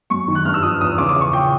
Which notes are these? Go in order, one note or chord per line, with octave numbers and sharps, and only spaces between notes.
F#2 C#6
D#3
F#6
G2 F6
E6
F3 D#6
E2 D#6
C#3 D6
D6
C#3 C#6
A#2 G5